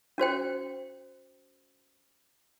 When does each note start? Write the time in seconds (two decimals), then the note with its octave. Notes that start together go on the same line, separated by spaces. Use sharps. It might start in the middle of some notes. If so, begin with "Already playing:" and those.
0.18 C#4 F#4 C5 G5